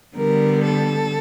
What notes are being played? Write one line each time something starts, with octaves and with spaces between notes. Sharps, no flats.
D3 G3 B3 A#4
A4